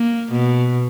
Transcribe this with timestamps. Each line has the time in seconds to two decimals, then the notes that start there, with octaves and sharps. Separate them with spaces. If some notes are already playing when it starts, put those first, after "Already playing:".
Already playing: A#3
0.32 B2